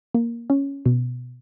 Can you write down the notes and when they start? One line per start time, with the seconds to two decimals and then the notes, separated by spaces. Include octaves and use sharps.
0.14 A#3
0.50 C#4
0.86 B2